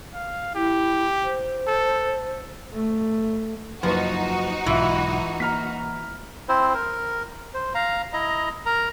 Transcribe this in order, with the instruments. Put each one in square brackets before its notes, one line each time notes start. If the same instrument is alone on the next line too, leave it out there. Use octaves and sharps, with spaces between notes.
[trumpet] F5
[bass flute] E4 [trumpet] G4
[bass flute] C5
[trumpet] A4
[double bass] A3
[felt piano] F#1 B4 [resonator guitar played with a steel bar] F3 [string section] D#4 F#4
[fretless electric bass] B1 G#2 [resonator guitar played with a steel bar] E3 [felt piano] F4 E5
[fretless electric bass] A#3 [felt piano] A#5 F6 B6
[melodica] C4 E4 C5
A#4
C5
F5 A#5
E4 D#5 A#5
A#4 A#5